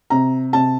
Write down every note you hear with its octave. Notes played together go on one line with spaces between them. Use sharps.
C3 A#5
C3 A5